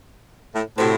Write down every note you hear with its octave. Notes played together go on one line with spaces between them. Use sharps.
A2
A2 C3 F#3 C4